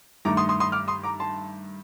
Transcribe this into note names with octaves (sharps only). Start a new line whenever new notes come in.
G2 D#3 A3 A#5 D6
C6 D#6
C6 D#6
C6 D#6
D6 F6
C6 D#6
A#5 D6
A5 C6